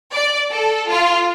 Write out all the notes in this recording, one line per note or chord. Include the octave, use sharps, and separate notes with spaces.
D5
A4
F4